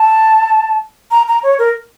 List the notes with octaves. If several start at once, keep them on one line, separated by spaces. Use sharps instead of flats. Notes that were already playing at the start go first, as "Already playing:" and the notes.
Already playing: A5
A#5
A#5
C#5
A#4